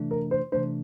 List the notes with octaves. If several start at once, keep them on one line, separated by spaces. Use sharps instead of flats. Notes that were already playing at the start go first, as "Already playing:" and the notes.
Already playing: C3 E3 A3 D4
A#4
C5
C3 E3 A3 D4 C5